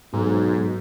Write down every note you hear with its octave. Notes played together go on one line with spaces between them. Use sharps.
B1 G#2